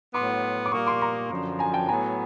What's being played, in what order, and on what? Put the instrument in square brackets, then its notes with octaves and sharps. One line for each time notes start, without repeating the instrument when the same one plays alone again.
[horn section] A2 F#3 B3 [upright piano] C6 D6
[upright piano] D6
[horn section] A#2 G3 A#3 [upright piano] C#6 D#6
[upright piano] C6 D6
A#5 C6
[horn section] F#2 D3 F3
[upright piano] G#5 A#5
G5 A5
[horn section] A2 F#3 B3 [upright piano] G#5 A#5